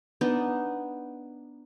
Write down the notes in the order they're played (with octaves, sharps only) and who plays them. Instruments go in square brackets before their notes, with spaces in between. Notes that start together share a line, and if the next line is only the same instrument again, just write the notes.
[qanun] B3 D4 D#4